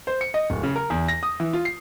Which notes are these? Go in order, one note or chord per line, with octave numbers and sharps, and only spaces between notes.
C5
C#7
D#5
D1
C#3
A#4
E2
A#6
D#6
E3
F4
C7